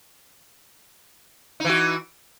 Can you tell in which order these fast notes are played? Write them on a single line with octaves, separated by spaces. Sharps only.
D#4 E3 F#4